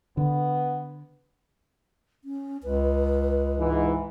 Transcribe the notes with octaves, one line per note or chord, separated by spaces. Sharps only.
D3 B3
C#4
C#2 B4
G#2 E3